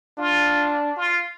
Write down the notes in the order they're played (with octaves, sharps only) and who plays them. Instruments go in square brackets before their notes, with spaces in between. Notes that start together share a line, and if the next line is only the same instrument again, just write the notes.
[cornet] D4 [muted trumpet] F4
[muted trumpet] F4